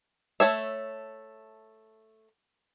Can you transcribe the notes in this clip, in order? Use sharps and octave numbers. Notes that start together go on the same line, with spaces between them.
A3 C#5 E5